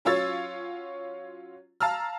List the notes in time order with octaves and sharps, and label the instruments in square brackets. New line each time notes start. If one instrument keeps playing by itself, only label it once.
[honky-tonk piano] F#3 C#4 F4 C#5 E6 A6
F5 A5 A#5 E6 F6